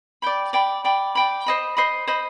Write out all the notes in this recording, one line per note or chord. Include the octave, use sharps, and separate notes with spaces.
D5 G5 B5
D5 G5 B5
D5 G5 B5
D5 G5 B5
C5 D#5 B5
C5 D#5 B5
C5 D#5 B5